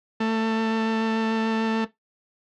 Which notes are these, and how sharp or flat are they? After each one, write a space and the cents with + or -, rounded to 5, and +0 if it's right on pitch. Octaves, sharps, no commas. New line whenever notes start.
A3 +20